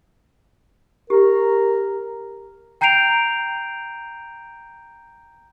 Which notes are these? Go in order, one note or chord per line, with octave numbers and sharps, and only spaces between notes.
G4 A#4
G5 A#5 G6 C7 D7 F7